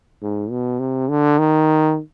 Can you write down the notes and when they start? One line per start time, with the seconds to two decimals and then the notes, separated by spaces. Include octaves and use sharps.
0.22 G#2
0.51 B2
0.80 C3
1.09 D3
1.39 D#3